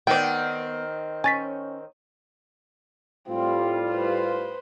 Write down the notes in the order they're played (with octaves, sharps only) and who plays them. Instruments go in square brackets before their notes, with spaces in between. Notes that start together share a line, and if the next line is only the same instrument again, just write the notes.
[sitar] D#3 C4 [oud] B3 [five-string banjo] D5 G5
[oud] C#4 [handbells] G#5 A6 B6
[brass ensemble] A2 G3 F4 [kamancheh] C4
[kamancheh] B4 C5